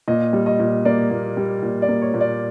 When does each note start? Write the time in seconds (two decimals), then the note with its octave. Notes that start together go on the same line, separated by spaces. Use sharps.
0.08 A#2 D#5
0.33 G3
0.46 D#5
0.59 A#2
0.85 A#3 D5
1.11 A#2
1.37 G3
1.63 A#2
1.82 D5
1.88 A#3
2.02 C#5
2.14 A#2
2.21 D5